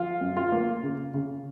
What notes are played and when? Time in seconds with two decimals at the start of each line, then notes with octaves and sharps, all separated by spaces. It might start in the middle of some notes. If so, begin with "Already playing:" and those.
Already playing: F3 F4
0.21 F#2
0.37 F4
0.52 A#3
0.83 C#3
1.14 C#3